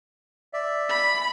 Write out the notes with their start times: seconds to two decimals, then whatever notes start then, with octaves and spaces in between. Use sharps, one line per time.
0.53 D5 E5
0.89 B5